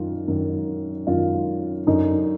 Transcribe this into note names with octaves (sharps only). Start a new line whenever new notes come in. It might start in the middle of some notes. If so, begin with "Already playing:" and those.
Already playing: F#2 D#3 F4
F#2 D#3
F#2 D#3 F4
F#2 D3 D#4